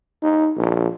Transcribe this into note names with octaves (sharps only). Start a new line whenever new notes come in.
D#4
A#1